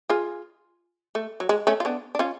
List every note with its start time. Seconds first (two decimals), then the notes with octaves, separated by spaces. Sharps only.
0.09 F4 G#4
1.15 A3
1.40 F#3
1.49 G#3
1.67 A3 C#4
1.80 F4
1.85 B3 D4
2.15 D4
2.19 C#4 F4